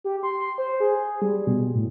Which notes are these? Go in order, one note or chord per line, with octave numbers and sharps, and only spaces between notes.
G4
C6
C6
C5
G#4
G3
B2
A2